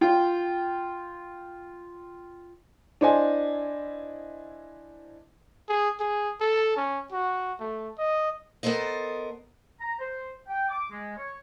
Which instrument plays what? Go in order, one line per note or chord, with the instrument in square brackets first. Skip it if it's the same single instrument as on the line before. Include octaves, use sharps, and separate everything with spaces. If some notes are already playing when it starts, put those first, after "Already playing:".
[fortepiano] F4 G5
[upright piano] D4 E4 C5 D#5 G#5
[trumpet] G#4
G#4
A4
C#4
F#4
A3
D#5
[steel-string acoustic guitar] B3 A4 A#4 C5 D#5
[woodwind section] A#5
C5
G5
D6
G#3
C#5